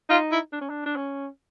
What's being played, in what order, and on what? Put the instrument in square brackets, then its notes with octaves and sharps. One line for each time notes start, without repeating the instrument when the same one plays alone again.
[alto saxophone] D#4 [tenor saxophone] F4
[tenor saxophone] E4
[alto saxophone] D4
C#4
D4
D4
C#4